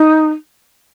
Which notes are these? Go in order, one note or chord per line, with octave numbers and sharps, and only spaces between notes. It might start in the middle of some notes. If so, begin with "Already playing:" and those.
Already playing: D#4